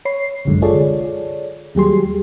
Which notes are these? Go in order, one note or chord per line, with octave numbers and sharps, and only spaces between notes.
C#5 B5 C7
G1 C2 F#2 D3 G#3
F4 G#4 A4 C#5 D5
D#2 F#3 G3 G4 G#4 C6